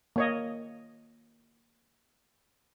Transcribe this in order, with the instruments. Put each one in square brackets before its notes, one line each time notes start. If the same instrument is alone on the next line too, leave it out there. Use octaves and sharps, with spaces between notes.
[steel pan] A#3 C#5 D#5